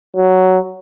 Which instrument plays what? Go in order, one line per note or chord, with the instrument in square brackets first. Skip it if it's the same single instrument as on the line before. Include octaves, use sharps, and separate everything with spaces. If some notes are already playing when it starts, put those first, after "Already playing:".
[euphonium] F#3